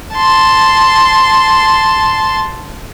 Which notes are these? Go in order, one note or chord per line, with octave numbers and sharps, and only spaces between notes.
A5 C6